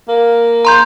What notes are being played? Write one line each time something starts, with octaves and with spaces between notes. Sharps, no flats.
A#3
A#5 C6 G6